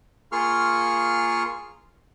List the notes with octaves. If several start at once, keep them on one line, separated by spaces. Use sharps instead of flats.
A#3 F4 G#4 C6 C#6 F6